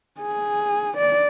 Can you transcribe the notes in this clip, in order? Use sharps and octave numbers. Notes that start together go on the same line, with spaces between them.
G#4
D5